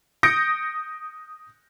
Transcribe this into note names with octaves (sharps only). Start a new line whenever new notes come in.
D#6 G6 A#6 C#7 D7